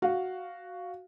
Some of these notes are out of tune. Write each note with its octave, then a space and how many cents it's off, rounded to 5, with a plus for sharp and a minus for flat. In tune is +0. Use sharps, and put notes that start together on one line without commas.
F#4 +0 F5 +0